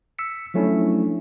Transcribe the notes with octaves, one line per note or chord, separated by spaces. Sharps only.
E6 B6 C#7
F3 F#3 A3 C#4 D4 E4